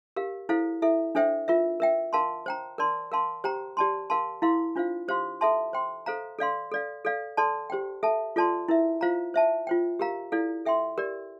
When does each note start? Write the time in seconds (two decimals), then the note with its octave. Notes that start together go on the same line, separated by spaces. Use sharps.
0.16 G4 A#4 F5
0.49 E4 A4 C5 F5
0.82 E4 A4 E5
1.15 D4 A4 C5 E5 G5
1.48 F4 A#4 E5
1.80 A#4 E5 G5
2.13 A#4 F5 A5 C6
2.46 C5 G5 A#5
2.78 A#4 D5 A5 C6
3.12 A#4 F5 A5 C6
3.44 G4 C5 G5 A#5
3.77 G4 D5 A5 C6
4.10 A#4 F5 A5 C6
4.42 E4 A#4 F5 C6
4.76 D4 F4 C5 F5
5.08 G4 C5 F5 C6
5.41 A4 E5 A5 C6
5.73 C5 G5 C6
6.06 A4 C5 F5 A#5
6.39 A4 D5 F5 C6
6.72 A4 D5 F5
7.05 A4 D5 F5
7.37 A4 D5 A5 C6
7.70 G4 C5 G5
8.03 A4 E5 A5
8.36 F4 A4 D5 A5 C6
8.68 E4 A#4 E5
9.01 F4 C5 F5 A#5
9.34 C5 E5 A5
9.67 F4 C5 G5
9.99 G4 A#4 F5 A#5
10.32 E4 A4 D5 F5
10.66 A4 E5 G5 C6
10.98 G4 A#4 D5